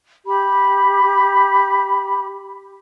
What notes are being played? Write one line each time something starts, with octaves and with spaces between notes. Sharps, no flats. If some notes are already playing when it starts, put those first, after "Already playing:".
G4 B5